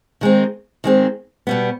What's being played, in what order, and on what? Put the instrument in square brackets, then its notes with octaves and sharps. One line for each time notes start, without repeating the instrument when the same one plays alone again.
[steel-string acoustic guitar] D#3 G#3 C4
D#3 G#3 C4
B2 G3 B3